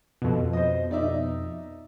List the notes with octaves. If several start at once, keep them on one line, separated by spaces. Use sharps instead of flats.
F2 B2
C5 D#5
D#4 D5 E5